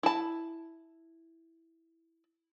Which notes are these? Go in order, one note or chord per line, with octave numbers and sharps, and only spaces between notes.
E4 A5